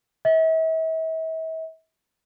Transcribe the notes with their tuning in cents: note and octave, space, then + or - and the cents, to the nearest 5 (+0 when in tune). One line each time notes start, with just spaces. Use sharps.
E5 -40